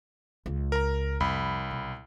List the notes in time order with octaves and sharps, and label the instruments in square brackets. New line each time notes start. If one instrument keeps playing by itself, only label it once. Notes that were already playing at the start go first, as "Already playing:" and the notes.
[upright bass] C#2
[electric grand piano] A#4 A#5
[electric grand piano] C2 B5 [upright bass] F2
[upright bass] B1